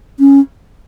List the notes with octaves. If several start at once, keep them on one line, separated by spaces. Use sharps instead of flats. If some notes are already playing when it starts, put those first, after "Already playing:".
C#4